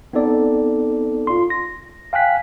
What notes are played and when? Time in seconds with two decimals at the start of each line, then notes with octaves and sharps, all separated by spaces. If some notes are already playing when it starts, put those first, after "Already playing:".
0.13 B3 C4 D#4 A4 D5
1.27 F4 C6
1.50 A#6
2.13 F5 G5 G#5 F#6 B6